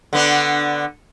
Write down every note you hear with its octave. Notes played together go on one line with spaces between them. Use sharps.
D3 B3 D4